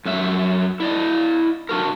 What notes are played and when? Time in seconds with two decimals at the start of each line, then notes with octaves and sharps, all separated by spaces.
0.05 F#2 F#3 E5
0.80 E4 D5 D#5
1.69 D4 F#4 A#4